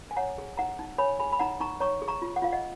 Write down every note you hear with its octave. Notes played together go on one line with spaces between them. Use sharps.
G#5
C#5 F#5 A#5
G#4
D#4 F#5 A#5
D#4
C#5 G#5 B5
G#4 G#5 B5
B5
D#4 F#5 A#5
D#4 A#5 C#6
C#5 A#5 C#6
G#4
A#5 C#6
F4
F#5
F4 F5
D#5 F#5